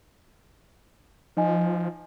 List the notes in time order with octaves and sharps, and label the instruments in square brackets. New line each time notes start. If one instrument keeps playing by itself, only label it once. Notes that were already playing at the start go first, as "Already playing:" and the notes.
[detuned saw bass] F3 [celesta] D#4 D#5 G#5